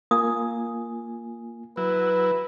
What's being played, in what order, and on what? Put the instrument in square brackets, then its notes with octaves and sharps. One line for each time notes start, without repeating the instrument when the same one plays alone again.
[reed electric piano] A#3 F4 G#5 [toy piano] D#6
[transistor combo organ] F#3 E4 [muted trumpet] B4